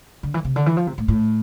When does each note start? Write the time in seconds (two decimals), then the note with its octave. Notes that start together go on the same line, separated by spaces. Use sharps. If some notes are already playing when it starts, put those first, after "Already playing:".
0.23 D3
0.34 E3
0.45 C3
0.56 D3
0.66 E3
0.77 F3
0.87 C3
0.98 A2
1.08 A2